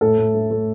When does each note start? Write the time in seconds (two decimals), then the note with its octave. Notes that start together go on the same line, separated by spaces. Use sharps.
0.01 A2 A4
0.18 A2
0.35 A3
0.51 A3